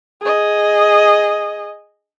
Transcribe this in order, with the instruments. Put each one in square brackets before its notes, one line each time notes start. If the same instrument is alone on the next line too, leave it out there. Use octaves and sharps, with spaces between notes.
[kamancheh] G#4 D#5